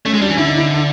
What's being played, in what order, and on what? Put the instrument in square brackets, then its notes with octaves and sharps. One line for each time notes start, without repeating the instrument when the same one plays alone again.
[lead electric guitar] A3 [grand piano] C#4
[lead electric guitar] G#3
[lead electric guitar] G3 [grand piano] D4
[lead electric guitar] E3
[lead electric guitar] D3 [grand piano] E4
[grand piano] D#4
E4